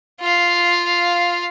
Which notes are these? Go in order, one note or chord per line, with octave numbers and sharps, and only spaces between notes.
F4 F5